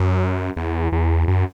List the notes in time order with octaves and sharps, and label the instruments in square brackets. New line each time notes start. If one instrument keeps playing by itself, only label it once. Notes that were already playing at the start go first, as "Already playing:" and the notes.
Already playing: [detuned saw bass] F#2
E2
E2
F#2